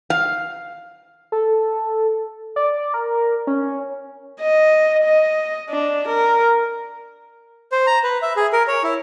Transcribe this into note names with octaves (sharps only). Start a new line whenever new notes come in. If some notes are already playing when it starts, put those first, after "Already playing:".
F5
A4
D5
A#4
C#4
D#5
D#5
D4
A#4
C5
A#5
B4
E5
G#4
A#4
C#5
E4